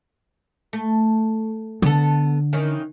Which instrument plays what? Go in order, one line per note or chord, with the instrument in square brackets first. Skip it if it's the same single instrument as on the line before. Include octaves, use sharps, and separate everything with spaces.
[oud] A3
[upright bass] D3 [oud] B3 A4
[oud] D#3 E3 C#4